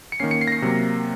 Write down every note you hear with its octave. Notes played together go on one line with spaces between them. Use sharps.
C#7
D#3 A#3 C#4 C7
C#7
C7
A#6
C7
C3 F#3 A#3